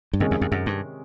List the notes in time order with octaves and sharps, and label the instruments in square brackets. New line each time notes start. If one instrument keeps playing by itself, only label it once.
[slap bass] G2
[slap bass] F#2 [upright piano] C3 D#3 G#3 C#4
[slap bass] E2
F2
F#2
G2